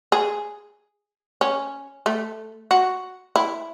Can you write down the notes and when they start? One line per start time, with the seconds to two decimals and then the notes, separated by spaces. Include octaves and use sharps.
0.12 G#4
1.41 C#4
2.06 A3
2.71 F#4
3.36 E4